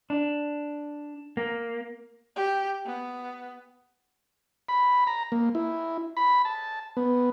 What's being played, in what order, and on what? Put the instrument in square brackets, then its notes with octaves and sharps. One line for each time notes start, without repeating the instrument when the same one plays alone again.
[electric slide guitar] D4
A#3
[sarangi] G4
B3
[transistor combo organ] B5
A#5
A#3
E4
B5
A5
B3